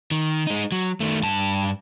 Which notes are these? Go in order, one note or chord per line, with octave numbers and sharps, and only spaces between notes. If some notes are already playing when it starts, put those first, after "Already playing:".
D#3
G#3 D#4
F#3
D#3 A3
G2 A5